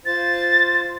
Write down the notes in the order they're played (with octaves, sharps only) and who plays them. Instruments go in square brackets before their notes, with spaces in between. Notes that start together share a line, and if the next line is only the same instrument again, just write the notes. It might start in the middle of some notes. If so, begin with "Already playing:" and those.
[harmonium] F4 C5 [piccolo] A6